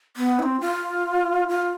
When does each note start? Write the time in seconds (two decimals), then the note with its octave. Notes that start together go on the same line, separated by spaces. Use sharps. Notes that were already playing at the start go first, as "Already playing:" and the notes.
0.17 B3
0.39 E4
0.43 C4
0.61 F4
1.48 F4